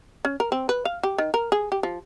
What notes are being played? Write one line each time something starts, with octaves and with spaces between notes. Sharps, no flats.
C#4
A#4
C4
B4
F5
G4
D#3
A#4
G#4
G4
F3